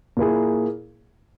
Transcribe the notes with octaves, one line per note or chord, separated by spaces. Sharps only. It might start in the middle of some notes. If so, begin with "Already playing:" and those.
A#2 A#3 E4 G#4